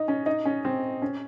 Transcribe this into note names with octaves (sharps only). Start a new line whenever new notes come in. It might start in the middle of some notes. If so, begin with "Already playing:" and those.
Already playing: D#4
C#4
D#4
C#4
C4
C#4